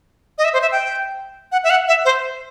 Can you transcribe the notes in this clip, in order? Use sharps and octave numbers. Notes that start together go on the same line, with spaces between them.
D#5
E5
C5
E5
G5
F#5
E5
F#5
E5
C5